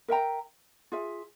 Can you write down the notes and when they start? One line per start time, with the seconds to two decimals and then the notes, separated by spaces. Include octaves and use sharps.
0.08 A#4 E5 G5 A#5
0.92 F4 G#4 E5